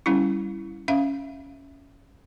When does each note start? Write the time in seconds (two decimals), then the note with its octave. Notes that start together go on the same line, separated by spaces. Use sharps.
0.06 G3 C#4 E4
0.88 C#4 E5 F5